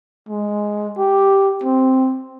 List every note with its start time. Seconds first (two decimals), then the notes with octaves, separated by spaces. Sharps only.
0.29 G#3
0.98 G4
1.64 C4